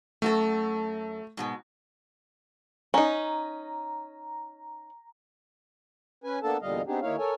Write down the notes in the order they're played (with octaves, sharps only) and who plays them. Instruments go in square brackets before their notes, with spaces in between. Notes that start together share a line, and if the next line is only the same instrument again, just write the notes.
[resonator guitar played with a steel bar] F#2 F#4 A4 [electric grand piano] A3
[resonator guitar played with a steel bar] G#2 B2 G#3
[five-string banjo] C#4 D#4 [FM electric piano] A#5
[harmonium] C#4 B4 G#5
A#3 B3 D4 A4 A5
E2 A#2 D3 G3 D#5 F5
B3 C4 D4 D#4 G4 G#4
D#2 A#3 D#4 E4 C#5 F5
A4 A#4 C#5 G#5